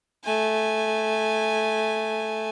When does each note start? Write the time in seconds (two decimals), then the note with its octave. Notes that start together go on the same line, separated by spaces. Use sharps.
0.24 A3 G#5